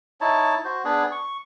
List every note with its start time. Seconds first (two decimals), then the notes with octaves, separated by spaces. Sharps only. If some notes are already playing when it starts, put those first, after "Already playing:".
0.21 D#4 E4 C#5 A5
0.65 F#4 C5
0.85 B3 D4 G#4
1.12 C#6